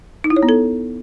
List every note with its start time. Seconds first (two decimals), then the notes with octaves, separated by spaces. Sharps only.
0.24 D#4
0.30 E4
0.36 C#5
0.43 B3
0.49 A4